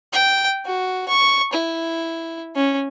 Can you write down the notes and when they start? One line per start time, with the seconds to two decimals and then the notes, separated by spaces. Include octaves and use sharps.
0.12 G5
0.66 F#4
1.08 C#6
1.53 E4
2.55 C#4